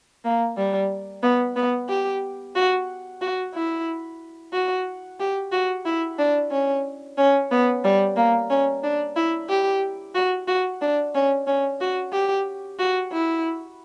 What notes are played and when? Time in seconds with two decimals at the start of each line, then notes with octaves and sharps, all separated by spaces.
0.25 A#3
0.57 G3
1.23 B3
1.56 B3
1.89 G4
2.56 F#4
3.21 F#4
3.54 E4
4.53 F#4
5.20 G4
5.52 F#4
5.85 E4
6.19 D4
6.51 C#4
7.18 C#4
7.51 B3
7.84 G3
8.16 A#3
8.50 C#4
8.84 D4
9.16 E4
9.49 G4
10.15 F#4
10.47 F#4
10.81 D4
11.15 C#4
11.47 C#4
11.81 F#4
12.13 G4
12.79 F#4
13.12 E4